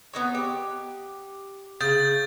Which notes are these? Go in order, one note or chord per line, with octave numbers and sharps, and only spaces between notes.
B3 D#4 C#5
G4
C#3 G6 A6